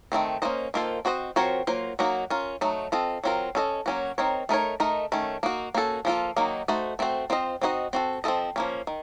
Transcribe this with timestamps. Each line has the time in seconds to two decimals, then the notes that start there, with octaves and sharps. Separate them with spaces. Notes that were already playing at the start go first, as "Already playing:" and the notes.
0.12 D#3 F#3 A3 C4
0.42 A#3 C#4 F#4 C5 D#5
0.74 D#3 A#3 F4 A4 C5
1.05 C4 F#4 C5 D#5
1.36 F3 C4 F#4 A#4 C#5
1.67 F#3 A#3 F4 C5
1.99 F#3 A#3 D#4 F#4
2.30 C#4 F4 A#4
2.61 F#3 A3 D#4
2.92 C4 F4 A4 D#5
3.24 F#3 C4 F4 A#4
3.55 C#4 A4 C5 D#5
3.86 F#3 A#3 C#4 F#4
4.18 C4 D#4 A#4 C#5
4.49 A3 D#4 A#4 C#5
4.80 A3 D#4 A#4 D#5
5.12 D#3 A3 C#4
5.43 A#3 D#4 F#4
5.75 A#3 C#4 F#4 A4
6.05 F3 A#3 C#4 F4 A4
6.36 D#3 F#3 A#3 D#4
6.68 A3 D#4 F#4 C5
6.99 A3 C4 F#4 C5
7.30 C4 F4 C5 D#5
7.61 C4 D#4 F#4 C5 D#5
7.93 C4 F#4 A4
8.24 F3 C4 F4 A4 D#5
8.56 F3 A#3 C#4
8.87 D#3